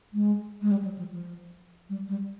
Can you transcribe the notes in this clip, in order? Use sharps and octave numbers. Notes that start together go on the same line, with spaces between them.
G#3
G#3
G3
F#3
F3
F3
G3
G3